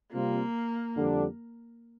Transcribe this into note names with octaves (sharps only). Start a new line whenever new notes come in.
C3 G3 A#3 C4 F4
F2 D3 G3 D4